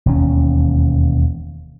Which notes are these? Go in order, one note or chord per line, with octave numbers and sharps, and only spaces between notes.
E1 D#2 C#4